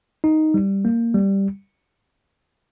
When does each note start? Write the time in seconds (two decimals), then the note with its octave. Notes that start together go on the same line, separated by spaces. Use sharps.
0.24 D#4
0.54 G3
0.85 A#3
1.14 G3